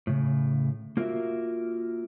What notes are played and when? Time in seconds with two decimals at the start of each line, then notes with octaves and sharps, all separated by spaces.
0.07 A2 C#3
0.97 A#3 F4 F#4 A#4 E5